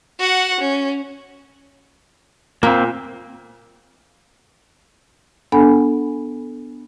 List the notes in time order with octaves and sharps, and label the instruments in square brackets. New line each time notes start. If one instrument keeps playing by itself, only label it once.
[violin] F#4 F#5
C#4
[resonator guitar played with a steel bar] A#2 [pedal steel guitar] A#3 C4
[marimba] B3 D4 A4 F#5 G#5 B5